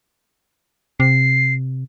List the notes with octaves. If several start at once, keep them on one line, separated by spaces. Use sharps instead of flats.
C3 C7